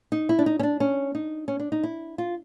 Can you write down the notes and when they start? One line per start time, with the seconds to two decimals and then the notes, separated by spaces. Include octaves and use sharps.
0.12 D#4
0.29 E4
0.39 D4
0.46 D#4
0.59 C#4
0.63 D4
0.80 C#4
1.15 D#4
1.48 C#4
1.59 D4
1.72 D#4
1.83 E4
2.18 F4